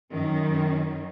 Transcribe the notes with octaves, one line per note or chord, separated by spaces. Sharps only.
F#2 D#3 C#4